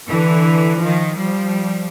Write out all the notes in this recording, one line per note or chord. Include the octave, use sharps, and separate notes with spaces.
D3 E3
D#3 F3
F3 G3